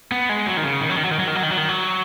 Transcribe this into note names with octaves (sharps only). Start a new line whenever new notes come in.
B3
G#3
F#3
D#3
C#3
D#3
F#3
D#3
F#3
D#3
F#3
D#3
F#3
D#3
F#3
D#3
F#3